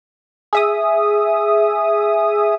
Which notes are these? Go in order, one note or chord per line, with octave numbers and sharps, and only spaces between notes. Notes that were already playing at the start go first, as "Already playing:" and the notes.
G#4 E5 D#6